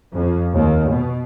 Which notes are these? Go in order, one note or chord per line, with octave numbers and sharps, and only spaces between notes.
F2
D#2
B2